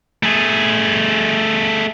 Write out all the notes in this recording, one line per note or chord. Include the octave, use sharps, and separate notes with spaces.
A3 G#4